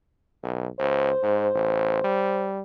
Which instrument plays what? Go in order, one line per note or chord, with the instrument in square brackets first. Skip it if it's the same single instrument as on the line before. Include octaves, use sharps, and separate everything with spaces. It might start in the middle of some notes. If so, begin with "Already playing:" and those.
[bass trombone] B1
[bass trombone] C#2 [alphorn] C5
[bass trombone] G#2
A1
G3